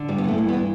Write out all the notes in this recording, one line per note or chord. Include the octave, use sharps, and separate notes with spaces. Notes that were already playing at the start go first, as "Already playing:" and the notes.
Already playing: D3
G2 G3
B3
E3 A3
G2
B3
E3